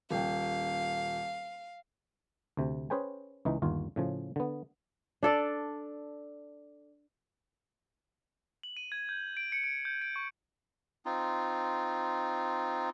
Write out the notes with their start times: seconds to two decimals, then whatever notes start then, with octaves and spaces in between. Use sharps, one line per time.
0.11 D#1 F5 G5
2.57 D2 C3
2.90 C#4 G#4 B4 C5 G5 G#5
3.45 C#2 E3 D#4
3.62 G1 D#2 F4
3.96 A2 C#3 F3
4.36 D3 B3
5.23 D4 A4 D5
8.63 F#7
8.77 D#7
8.92 G#6
9.09 G6
9.37 D7
9.52 C#7
9.64 D7
9.85 G6
10.02 D7
10.16 C#6
11.05 C4 D#4 F4